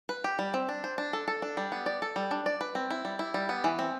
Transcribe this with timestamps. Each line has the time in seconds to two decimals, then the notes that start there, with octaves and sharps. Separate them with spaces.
0.09 B4
0.24 G4
0.39 G3
0.54 C4
0.69 D4
0.84 C5
0.98 D4
1.13 A4
1.28 A4
1.42 D4
1.57 G3
1.72 B3
1.86 D5
2.02 A4
2.16 G3
2.31 D4
2.46 D5
2.61 B4
2.75 C4
2.90 E4
3.05 G3
3.19 E4
3.34 G3
3.49 B3
3.64 E3
3.79 C4